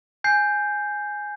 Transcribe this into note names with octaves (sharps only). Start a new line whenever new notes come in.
G#5 G6 C7